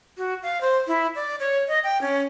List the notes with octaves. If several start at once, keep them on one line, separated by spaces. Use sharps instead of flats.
F#4
F5
C5
E4
D5
C#5
D#5
G5
C#4